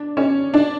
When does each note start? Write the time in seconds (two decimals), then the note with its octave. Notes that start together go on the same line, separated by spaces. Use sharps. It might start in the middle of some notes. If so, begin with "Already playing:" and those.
Already playing: D4
0.17 C#4
0.54 D4